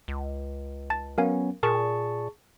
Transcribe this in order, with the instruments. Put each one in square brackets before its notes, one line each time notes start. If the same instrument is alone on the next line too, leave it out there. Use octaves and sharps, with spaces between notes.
[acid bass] C#2
[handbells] A5 A6
[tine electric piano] F#3 B3 C#4 [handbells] A#4 F5 G#5
[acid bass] A#2 [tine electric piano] G#4 A5 C#6 [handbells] A#4